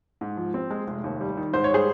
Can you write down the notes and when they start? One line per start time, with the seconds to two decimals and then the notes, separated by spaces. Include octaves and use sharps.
0.21 G#2
0.37 F3
0.54 C4
0.70 G#3
0.87 F1
1.04 D#2
1.20 G3
1.37 D#3
1.53 G#2 C5
1.64 C#5
1.71 G3 G#4 C5